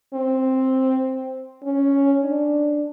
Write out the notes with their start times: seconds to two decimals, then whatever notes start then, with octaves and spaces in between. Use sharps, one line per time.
0.14 C4
1.63 C#4
2.22 D4